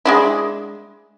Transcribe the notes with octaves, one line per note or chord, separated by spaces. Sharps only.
G#3 D4 E4